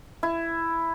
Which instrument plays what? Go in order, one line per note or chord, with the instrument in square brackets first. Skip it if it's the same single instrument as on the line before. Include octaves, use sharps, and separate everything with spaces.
[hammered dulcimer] E4